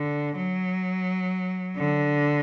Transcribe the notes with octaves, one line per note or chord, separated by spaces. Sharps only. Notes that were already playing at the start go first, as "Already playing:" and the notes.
Already playing: D3
F#3
D3